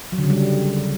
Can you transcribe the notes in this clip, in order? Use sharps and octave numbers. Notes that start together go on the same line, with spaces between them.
F#3
D3
C#3
G3